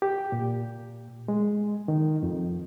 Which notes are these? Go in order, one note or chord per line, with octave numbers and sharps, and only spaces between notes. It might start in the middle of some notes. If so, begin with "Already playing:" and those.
G4
A#2
G#3
D#3
F2